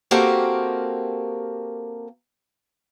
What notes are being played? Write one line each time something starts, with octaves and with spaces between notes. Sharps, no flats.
A#3 C4 F#4 G4 A4 A#4